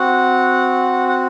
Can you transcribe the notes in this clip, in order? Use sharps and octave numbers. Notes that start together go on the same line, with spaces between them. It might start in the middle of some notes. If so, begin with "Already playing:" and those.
Already playing: C4 F#4 F#5
F#5